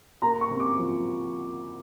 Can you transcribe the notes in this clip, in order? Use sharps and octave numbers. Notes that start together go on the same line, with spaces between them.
A#3 A#5
C#6
C3
D6
F3